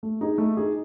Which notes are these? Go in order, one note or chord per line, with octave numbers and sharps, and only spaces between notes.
A3
D#4 G#4
A3
D#4 G#4